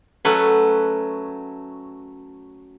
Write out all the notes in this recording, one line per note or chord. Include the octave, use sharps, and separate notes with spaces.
F#3 A3 C#4 B4